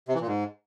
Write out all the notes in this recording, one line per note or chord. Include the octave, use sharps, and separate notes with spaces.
C3
E3
A#2
G#2